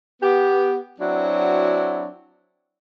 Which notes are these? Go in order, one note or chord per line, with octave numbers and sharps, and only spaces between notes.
B3 G4
F#3 C4 D4 E4 F#4